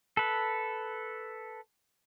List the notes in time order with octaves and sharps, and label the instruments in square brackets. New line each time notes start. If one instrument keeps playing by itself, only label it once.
[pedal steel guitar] A4 B4